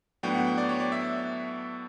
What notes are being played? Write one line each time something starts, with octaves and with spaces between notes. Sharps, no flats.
A2 F#3 B3 D4 G5
F#5
G5
D5
C#5
D5
E5